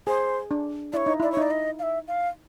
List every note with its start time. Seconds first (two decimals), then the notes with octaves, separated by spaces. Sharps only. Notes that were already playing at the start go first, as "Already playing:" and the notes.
0.07 G#4 C5
0.51 D4
0.93 E4 C#5 D5
1.06 D#4
1.20 E4 D5
1.32 C#5
1.37 D#4 D5
1.51 D#5
1.79 F5
1.83 E5
2.08 F5